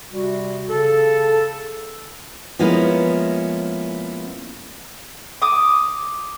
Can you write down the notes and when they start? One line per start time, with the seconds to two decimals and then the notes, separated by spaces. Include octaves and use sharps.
0.11 C3 G3 F#4
0.69 C#3 A4
2.59 F3 G#3 A#3 B3 C#4 E4
5.42 D6 D#6